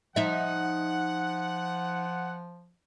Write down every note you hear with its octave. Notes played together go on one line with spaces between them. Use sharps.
F3 D#4 E5 F#5